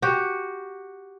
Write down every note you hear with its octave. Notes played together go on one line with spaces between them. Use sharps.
F#4 G4